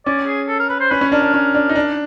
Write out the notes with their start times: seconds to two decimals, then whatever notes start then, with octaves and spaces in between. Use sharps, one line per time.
0.06 C#4 D5
0.27 G#4
0.48 A4
0.60 A#4
0.70 B4
0.80 C5
0.91 C#4 B4
1.01 C#4
1.12 D4 A#4
1.22 D4
1.34 C#4
1.55 D4
1.69 D#4
1.75 D4